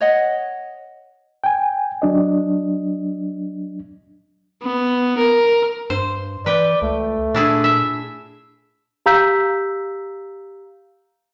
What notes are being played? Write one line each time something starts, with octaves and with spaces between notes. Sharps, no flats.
C#5 D#5 F#5
G5 G#5
F#3 D4 D#5
B3
A#4
G2 C5
E3 B4 D5 G5
C#2 A3
A#2 D4 E4 G#4
E5
G4 F5 A#5 E6 G6 B6